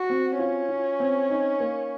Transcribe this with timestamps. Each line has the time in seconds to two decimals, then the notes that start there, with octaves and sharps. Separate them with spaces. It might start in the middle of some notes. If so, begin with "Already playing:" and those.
Already playing: F#4
0.10 C4
0.39 C#4 F4
0.69 F4
1.00 C4
1.30 D#4
1.60 A#3